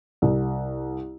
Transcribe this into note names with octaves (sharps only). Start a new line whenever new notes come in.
C2